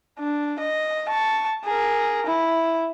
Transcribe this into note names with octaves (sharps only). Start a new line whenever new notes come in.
D4
D#5
A5 C#6
G#4 A#4
E4